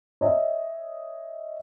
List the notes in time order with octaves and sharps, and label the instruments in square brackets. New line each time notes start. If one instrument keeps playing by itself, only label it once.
[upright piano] C#5 D#5 E5